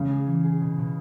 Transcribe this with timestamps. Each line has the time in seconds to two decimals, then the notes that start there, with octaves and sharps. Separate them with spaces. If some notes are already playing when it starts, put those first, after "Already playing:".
Already playing: C#3 C#4
0.10 G#4
0.27 E3
0.44 G#4
0.61 B2
0.79 B2